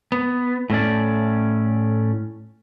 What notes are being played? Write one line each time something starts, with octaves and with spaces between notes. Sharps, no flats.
B3
A2 A3 C#4 D5